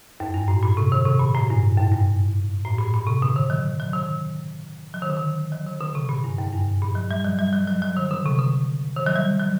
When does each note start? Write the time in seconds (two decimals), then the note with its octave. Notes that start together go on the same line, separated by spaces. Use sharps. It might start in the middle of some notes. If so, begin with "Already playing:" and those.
0.20 F#2
0.34 G2
0.48 A2
0.63 A#2
0.77 C3
0.92 D#3
1.06 C3
1.20 A#2
1.35 A2
1.50 G2
1.77 F#2
1.92 G2
2.65 A2
2.78 A#2
2.93 A#2
3.07 C3
3.22 D3
3.36 D#3
3.50 F#3
3.80 F#3
3.93 D#3
4.94 F#3
5.02 D#3
5.10 D3
5.17 D#3
5.52 F#3
5.66 D#3
5.80 D3
5.95 C3
6.09 A#2
6.24 G2
6.38 F#2
6.52 G2
6.82 A#2
6.95 F#3
7.11 G3
7.24 F#3
7.39 G3
7.53 F#3
7.67 F#3
7.82 F#3
7.97 D#3
8.11 D3
8.26 C3
8.39 D3
8.96 D#3
9.06 F#3
9.16 G3
9.40 F#3